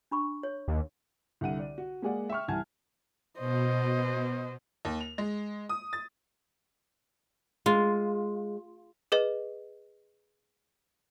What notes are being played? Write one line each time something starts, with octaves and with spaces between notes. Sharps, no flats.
D4 B5 C#6
C#5
D#2
C2 D3 F#5 D#7
D5
F#4
G#3 A#3 G#4 D5 F#5
E5 G5 C#6 F6
C2 E3 F#5 G#5 A5 G#6
B2 C5 D#5
D#2
F7
G#3
D#6
A6
G#3 F4
G#4 B4 D#5